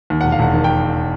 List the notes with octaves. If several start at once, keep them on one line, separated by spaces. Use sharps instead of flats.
D#2
E1 F#5
F5
E1 F#5
D#3
G5